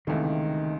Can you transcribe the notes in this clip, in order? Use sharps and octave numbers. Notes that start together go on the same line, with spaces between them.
C#2 C3 D#3 E3 A3